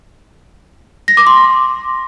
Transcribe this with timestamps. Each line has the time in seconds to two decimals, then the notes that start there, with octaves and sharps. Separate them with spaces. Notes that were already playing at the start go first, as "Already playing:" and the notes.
1.08 A#6
1.17 D6
1.27 C6